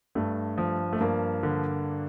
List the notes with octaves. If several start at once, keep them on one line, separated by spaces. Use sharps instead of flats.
G2 A3
F3
A3
G2 A#3
D3